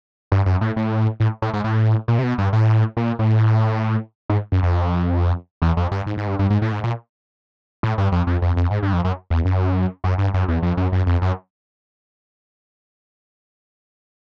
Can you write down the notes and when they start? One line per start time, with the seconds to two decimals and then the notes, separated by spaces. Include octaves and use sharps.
0.32 G2
0.46 F#2
0.61 A2
0.76 A2
1.20 A2
1.42 A2
1.53 G#2
1.64 A2
2.08 A#2
2.19 C3
2.23 B2
2.38 G2
2.53 A2
2.97 A#2
3.19 A2
4.29 G#2
4.52 F#2
4.63 F2
5.62 E2
5.77 F2
5.91 G2
6.07 G#2
6.17 G#2
6.28 G2
6.39 G2
6.50 G#2
6.62 A2
6.72 G#2
6.84 A#2
7.83 A2
7.98 G2
8.12 F2
8.27 F2
8.42 F2
8.57 F2
8.71 G#2
8.83 G2
8.93 F2
9.04 F#2
9.30 E2
9.45 F#2
10.04 F#2
10.18 G2
10.34 F#2
10.48 E2
10.62 F2
10.77 F#2
10.92 F#2
11.07 F2
11.22 F#2